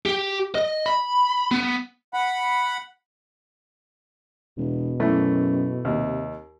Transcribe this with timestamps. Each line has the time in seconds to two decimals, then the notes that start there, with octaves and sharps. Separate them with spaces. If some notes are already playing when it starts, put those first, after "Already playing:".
0.06 G4
0.55 D#5
0.86 B5
1.51 B3
2.14 F#5 B5
4.58 E1 B2
5.00 F#2 E3 A3
5.85 D#2 C3